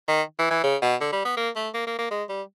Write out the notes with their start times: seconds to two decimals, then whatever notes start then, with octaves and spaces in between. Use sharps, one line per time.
0.08 D#3
0.39 E3
0.50 E3
0.64 C#3
0.82 B2
1.01 D3
1.12 G3
1.25 B3
1.37 A#3
1.56 A3
1.74 A#3
1.87 A#3
1.98 A#3
2.11 G#3
2.29 G3